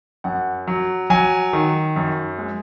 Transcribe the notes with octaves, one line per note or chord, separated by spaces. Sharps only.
F#2 F#5
F#3
F#3 G#5
D#3
F#2
G#3